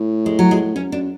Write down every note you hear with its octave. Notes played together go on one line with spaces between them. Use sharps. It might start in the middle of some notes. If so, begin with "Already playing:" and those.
Already playing: A2
G#3
F#3
G#3
F#2 C#4
F#2 D4